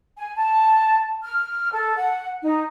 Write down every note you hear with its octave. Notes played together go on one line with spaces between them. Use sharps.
G#5
A5
F6
A4
F#5
D#4